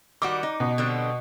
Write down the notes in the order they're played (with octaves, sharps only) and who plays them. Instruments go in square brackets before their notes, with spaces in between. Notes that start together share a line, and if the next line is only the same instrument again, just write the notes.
[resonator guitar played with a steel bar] D#3 G3 F#4 [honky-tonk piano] D6
[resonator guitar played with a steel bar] D#4
[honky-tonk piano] B2
[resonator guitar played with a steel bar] D3 G3 C4